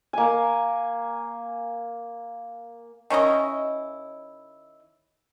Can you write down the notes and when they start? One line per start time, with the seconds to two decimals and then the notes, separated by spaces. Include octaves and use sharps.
0.13 A#3 G#5
3.10 D#3 C#4 E4 D#5